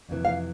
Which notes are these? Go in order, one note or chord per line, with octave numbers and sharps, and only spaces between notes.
F2 C3 E3
F5